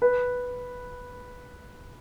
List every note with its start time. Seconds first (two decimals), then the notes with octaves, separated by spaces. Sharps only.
0.02 B4